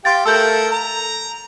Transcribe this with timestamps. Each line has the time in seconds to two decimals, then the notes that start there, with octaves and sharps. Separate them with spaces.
0.05 G4 F5 G5 C6 A6
0.26 A3 A4 A#4 E6 G6
0.71 A#5